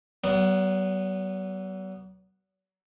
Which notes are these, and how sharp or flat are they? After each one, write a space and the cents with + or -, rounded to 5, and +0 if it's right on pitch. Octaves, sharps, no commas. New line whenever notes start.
F#3 +45 B3 -5